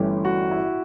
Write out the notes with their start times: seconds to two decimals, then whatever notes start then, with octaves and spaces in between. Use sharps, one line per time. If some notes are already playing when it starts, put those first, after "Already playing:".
Already playing: G1 G2 E3 A3 C#4 G4
0.25 F#4
0.51 E4